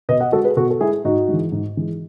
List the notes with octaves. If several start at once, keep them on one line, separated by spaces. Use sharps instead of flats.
B2 B4 D#5
D#5 F#5
G#3 F#4 A4
G#4 B4
B2 F#4 A4
A4
G#3 E4 G#4
G#2 D#4 F#4
E3 G#3
G#2
E3 G#3